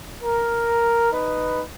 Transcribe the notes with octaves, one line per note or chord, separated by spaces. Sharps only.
A#4
D#4 B4